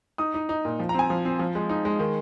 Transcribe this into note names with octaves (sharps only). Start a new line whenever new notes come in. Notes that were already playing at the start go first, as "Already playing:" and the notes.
D#4 D#6
D#4
D#4
A#2
F3
A#5
C4 G#5
F3
C4
F3
G#3
D#4
G#3
D#3